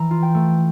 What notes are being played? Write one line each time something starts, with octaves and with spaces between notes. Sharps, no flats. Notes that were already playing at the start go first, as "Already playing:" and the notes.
Already playing: E3 A#5
F4
G5
A3